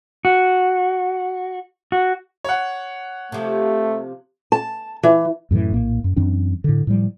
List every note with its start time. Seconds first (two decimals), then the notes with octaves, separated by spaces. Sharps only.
0.25 F#4
1.92 F#4
2.44 C#5 F#5
3.32 C3 F3 A3
4.52 A5
5.03 E3
5.51 F#2 A2 D3 E3
5.73 A#1 A2 A#3
6.04 F#2
6.16 F#2 E3 C4 D4
6.64 A2 D3
6.87 A2 F3 G3